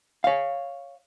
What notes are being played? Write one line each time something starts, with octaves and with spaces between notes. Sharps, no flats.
C#5 F5